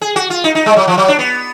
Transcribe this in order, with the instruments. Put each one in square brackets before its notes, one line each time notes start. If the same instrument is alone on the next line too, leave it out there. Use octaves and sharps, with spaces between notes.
[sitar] G#4
F#4
F4
D#4
D#4
G#3
F#3
F3
F#3
D4
B3